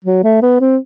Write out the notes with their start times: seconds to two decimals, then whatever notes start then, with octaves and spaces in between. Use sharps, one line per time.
0.04 F#3
0.23 A3
0.42 B3
0.60 C4